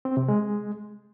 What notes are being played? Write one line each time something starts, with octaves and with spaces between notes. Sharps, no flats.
C4
C3
G#3